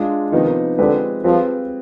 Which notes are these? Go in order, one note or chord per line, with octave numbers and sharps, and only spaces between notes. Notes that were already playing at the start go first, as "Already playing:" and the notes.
Already playing: G#3 D4 F4
C3 D#3 F3 B3 D#4
D3 F3 G#3 C4 G4 B4
F3 G3 C4 F4 G#4 B4